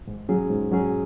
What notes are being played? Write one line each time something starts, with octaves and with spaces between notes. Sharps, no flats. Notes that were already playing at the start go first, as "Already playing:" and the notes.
G#2
F#3 C#4 G#4
G#2
F#3 C#4 G#4